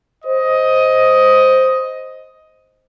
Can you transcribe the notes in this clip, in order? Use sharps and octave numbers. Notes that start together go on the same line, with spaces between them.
C5 D#5